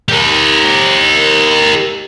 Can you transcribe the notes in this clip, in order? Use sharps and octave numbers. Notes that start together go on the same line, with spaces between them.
G4 A#4